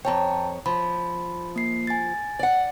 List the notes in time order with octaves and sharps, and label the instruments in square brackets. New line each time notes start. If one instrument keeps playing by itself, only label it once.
[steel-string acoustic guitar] F2 C#5 [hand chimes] G5 A5 A#5
[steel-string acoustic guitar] F3 [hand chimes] B5
[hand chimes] A#3 C7
G#5 A6
[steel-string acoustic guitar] D5 F#5